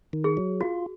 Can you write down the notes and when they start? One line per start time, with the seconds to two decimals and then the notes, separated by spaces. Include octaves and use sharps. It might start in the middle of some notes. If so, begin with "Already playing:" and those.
0.13 D#3
0.24 G#4
0.37 F#3
0.61 F4 F#4